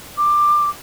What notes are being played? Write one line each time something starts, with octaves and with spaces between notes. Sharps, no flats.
D6